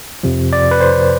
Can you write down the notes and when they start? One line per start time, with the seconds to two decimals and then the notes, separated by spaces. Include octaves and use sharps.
0.23 F2 C3 F3
0.53 D5
0.71 B4
0.81 C5